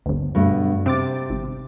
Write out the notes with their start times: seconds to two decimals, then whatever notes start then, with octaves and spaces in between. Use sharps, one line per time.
0.06 G1 D2
0.35 G2 B2 A3
0.86 C3 C4 D6 A6
1.29 G#1